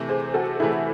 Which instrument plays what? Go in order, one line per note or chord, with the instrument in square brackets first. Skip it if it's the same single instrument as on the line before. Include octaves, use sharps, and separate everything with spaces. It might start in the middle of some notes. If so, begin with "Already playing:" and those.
Already playing: [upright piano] C3 E3 A3
[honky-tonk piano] G#4 C5
F#4 A4
[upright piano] C3 E3 A3 [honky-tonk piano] E4 G#4